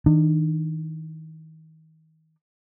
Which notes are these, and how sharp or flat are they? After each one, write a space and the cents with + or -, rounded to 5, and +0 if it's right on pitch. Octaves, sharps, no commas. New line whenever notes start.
D#3 +35 D4 +45